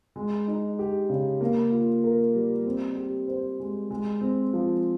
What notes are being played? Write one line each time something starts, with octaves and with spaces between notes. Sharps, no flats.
G#3
D#4
G4
C#3
A#3
F4
A#4
G3
C4
G4
C5
G#3
G#3
C4
F3